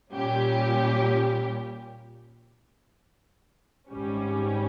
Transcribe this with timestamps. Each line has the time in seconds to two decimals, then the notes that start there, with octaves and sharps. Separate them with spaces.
0.14 A#2 G3 C#4 G4
3.90 G#1 G#2 G3 C#4